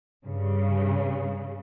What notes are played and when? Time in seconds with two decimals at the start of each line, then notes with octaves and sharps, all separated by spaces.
0.25 G2 C#3